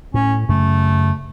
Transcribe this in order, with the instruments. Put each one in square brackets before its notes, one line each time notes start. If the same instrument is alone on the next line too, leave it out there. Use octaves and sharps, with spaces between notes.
[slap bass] A2 [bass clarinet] C#4
[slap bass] F#2 C#3 [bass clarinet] A3